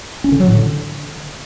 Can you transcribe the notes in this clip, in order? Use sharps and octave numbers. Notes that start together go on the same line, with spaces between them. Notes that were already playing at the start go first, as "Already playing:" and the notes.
C#4
D3
F#3
A2
D3